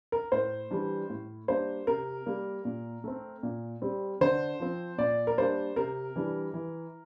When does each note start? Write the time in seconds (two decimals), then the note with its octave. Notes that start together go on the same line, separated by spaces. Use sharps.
0.12 A#4
0.32 A2 C5
0.71 E3 G3 D4
1.10 A2
1.48 G3 A#3 D4 C5
1.87 C3 A#4
2.26 G3 A#3
2.65 A#2
3.04 A3 C4
3.43 A#2
3.82 G3 C4
4.21 D3 C5
4.60 F3 C4
4.98 A#2 D5
5.27 A#4
5.38 G3 A#3 D4 C5
5.76 C3 A#4
6.16 E3 G3 D4
6.54 E3